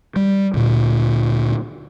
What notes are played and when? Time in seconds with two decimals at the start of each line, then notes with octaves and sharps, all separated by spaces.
0.16 G3
0.54 D2 A#2